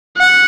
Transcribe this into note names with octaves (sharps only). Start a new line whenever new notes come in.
F#5